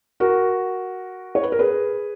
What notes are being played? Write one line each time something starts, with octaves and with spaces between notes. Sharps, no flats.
F#4 A#4
C#5
B4
A#4
G#4 B4